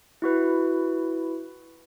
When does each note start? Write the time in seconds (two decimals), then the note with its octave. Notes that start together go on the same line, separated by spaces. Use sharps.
0.22 E4 F#4 B4